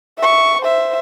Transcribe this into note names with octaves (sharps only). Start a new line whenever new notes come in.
E5 C#6
C5 E5